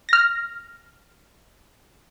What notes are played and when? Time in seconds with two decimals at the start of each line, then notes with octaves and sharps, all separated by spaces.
0.09 F6 A#6